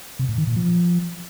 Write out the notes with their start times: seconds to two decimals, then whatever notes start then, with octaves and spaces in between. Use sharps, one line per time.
0.19 C3
0.29 A2
0.38 D#3
0.47 A#2
0.56 F3